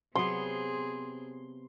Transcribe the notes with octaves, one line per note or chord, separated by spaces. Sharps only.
C3 F#3 B3 C4 G#4 C6